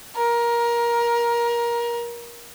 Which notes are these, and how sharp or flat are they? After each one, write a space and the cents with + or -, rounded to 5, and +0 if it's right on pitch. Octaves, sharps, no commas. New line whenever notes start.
A#4 +20